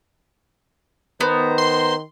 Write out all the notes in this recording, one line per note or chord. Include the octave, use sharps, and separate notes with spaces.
D#3 B3 C5 A#5
C6